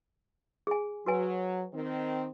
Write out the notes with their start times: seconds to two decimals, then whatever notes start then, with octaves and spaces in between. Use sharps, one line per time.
0.67 G#4 G#5
1.06 F#3 F#4 B4 G#5
1.73 D#3 C4